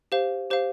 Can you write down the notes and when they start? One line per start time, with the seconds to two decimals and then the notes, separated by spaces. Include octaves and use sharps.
0.12 G4 C5 F5
0.50 G4 C5 F5